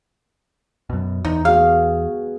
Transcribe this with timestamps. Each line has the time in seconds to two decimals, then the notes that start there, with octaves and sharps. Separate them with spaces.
0.90 F#2 B2
1.25 E2 D#4
1.45 B3 F#4 G#4 F5